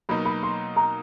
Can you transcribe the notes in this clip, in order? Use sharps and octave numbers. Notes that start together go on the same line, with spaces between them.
B2 F#3 A#3 D#4 B5
B5
C6
A#5